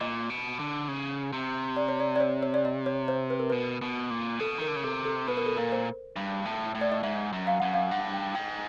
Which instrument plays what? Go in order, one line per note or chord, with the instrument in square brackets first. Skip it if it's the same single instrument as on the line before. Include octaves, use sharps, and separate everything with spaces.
[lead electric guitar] A#2 [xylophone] D#5
[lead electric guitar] B2
D3
C#3
C3
[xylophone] D5
C#5
D5
D5
C#5
C#5
D5
D#5
C#5
C5
B4
A#4
[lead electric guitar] B2 [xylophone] B4
[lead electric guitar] B2
A#2
[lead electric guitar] B2 [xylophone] A4
[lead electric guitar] D#3 [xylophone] A#4
[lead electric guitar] D3
C#3
[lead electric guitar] C3 [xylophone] A4
[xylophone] A4
[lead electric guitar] B2 [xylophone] B4
[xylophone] A#4
A4
[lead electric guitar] A#2 [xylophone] A#4
[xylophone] C5
[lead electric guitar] G2
A2
A2
[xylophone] D5
D#5
[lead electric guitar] G#2 [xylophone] E5
[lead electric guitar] F#2
[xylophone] F5
[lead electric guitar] F#2 [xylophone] F#5
[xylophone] F5
[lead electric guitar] G2 [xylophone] F#5
[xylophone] G5
[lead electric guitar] G#2 [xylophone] G5